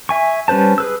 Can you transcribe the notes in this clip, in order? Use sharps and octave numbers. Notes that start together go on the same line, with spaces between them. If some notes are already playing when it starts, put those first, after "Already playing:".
E5 G#5 C#6
G3 C#4 B4 C5 A5
G#4 B4 E6